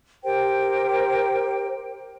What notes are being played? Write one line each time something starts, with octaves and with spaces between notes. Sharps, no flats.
G4 A#4 C5 G5